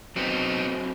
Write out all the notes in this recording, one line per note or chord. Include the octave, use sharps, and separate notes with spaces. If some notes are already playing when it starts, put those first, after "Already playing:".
F#3 B3 C4 D#4